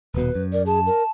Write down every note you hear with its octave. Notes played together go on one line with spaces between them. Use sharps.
D#1 B2 B4
F#2
A#4 D5
G#4 A5
A#4